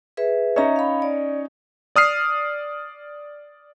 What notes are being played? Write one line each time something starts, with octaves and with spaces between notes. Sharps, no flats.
G#4 B4 E5
C#4 D#4 C#5 E5 A#5
F5 B5
D5
D5 D#6 F6 C7